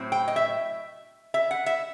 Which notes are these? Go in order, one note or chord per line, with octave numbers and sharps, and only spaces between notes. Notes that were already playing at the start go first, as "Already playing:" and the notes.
Already playing: A2 F#3 C4
G5
D#5
E5
E5
F#5
E5